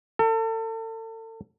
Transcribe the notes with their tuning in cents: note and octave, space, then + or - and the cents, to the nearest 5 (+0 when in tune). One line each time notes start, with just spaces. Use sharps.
A4 +35